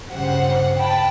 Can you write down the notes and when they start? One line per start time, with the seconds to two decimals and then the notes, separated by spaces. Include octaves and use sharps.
0.12 G2 C#3 G4 C5 F#5
0.78 G5 A5 B5